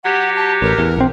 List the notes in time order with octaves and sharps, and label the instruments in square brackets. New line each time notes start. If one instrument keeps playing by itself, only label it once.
[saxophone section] F#3 G4 [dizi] F#5
[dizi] A5
[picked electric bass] A1 [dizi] A#4
[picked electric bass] E2
A#1 C4